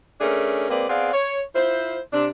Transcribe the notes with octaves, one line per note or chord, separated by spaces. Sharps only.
A3 C#4 D4 G#4 A#4
G#3 A#3 C4 B4 D5
B3 C4 G#4 D5 F5
C#5
E4 F4 C5
C3 D4